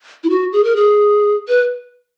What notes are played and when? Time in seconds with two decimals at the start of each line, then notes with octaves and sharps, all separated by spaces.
0.24 E4
0.30 F#4
0.52 G#4
0.64 A#4
0.76 G#4
1.48 B4